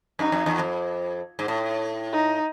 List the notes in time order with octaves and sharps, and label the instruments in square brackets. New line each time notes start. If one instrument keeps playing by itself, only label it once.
[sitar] F#2 [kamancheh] D#4
[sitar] F2
E2
F2
G#2
A2
[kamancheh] D#4